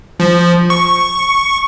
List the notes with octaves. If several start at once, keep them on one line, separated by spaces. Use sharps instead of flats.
F3
C#6